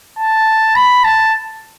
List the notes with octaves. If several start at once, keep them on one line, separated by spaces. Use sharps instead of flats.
A5
B5
A5